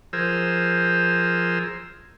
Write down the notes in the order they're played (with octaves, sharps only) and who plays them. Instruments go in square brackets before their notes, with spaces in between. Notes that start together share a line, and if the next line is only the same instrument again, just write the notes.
[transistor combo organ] F3 G#4 A#4 C5 E6